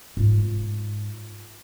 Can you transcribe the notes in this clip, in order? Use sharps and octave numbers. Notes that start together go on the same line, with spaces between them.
G#2 F4